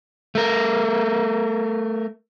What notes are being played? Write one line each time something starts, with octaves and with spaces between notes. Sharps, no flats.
A3 A#4